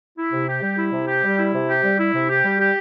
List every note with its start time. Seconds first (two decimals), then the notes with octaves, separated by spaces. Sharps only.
0.18 E4
0.32 C3
0.48 G4
0.62 G3
0.78 E4
0.92 C3
1.08 G4
1.24 G3
1.39 E4
1.54 C3
1.68 G4
1.84 G3
1.99 E4
2.14 C3
2.30 G4
2.45 G3
2.59 G4